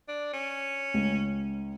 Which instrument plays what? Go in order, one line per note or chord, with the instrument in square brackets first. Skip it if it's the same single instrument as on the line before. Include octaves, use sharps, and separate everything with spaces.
[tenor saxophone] D4
C#4
[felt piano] C#2